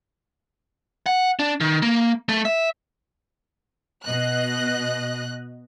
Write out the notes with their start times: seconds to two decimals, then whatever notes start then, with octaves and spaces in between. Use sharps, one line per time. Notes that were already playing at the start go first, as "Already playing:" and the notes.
1.06 F#5
1.39 D4
1.61 D#3
1.82 A#3
2.29 A3
2.45 E5
4.05 B2 D#5 F#6